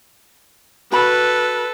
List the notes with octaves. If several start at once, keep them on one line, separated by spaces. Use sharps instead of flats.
F#4 A4 B4 B5